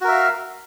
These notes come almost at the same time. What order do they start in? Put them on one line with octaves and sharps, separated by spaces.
F#4 A#4 E5 F5